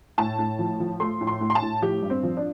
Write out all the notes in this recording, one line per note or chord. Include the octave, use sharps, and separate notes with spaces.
A2 A5
A2
F3
F3
A3 C6
A2
C6
A2
C6
A5
A2
F3 G4
G2
C4
F3
D4